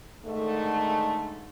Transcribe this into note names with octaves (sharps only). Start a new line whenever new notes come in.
G#2 D3 D#3 A3